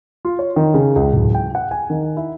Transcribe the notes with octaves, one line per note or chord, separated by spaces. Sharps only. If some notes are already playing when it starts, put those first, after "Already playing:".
F4
C#5
D#3
C#3
C#2
D1
G5
F#5
G#5
D#3
E4